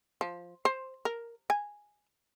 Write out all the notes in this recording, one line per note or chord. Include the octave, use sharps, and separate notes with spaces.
F3
C5
A#4
G#5